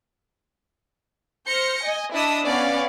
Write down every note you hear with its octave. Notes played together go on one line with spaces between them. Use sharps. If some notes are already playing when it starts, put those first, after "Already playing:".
C5 F6 G6 A#6 C#7
D#5 G#5
D4 E4 D#5 D#6 E6 B6
B3 C#4 D5 F5 G#5